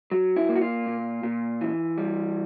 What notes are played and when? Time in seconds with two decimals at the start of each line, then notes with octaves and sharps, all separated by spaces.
0.11 F#3
0.36 E4
0.49 A#3
0.56 F#4
0.61 F4
0.86 A#2
1.23 A#2
1.61 E3
1.98 G3